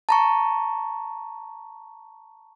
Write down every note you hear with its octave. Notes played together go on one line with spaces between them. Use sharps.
A5 A#5 C#6